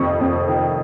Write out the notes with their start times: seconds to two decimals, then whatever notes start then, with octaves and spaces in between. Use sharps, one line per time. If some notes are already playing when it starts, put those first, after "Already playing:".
Already playing: F2 C3 D#3 C#6
0.21 F2
0.48 D#3